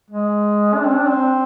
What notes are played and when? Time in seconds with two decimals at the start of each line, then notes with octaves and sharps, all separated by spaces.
0.11 G#3
0.75 D4
0.85 C4
0.96 D4
1.08 C4